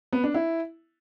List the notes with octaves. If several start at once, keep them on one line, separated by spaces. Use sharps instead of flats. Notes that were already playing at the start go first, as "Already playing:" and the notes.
B3
D4
E4